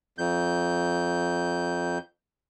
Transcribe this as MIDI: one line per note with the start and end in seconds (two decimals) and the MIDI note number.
0.18 1.98 41
0.18 1.98 91